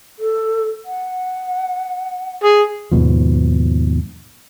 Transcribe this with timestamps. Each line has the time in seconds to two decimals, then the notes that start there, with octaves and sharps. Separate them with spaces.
0.19 A4
0.85 F#5
2.44 G#4
2.91 D#2 G#2 B2 F3